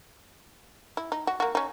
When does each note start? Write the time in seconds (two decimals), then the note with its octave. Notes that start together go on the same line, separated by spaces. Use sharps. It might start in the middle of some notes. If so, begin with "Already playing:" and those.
0.97 E4
1.12 D#4
1.27 F#4
1.40 A#3 F#4
1.55 C#4 D#4